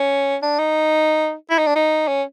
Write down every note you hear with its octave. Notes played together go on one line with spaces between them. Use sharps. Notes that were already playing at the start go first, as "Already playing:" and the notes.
Already playing: C#4
D4
D#4
E4
D#4
D4
D#4
C#4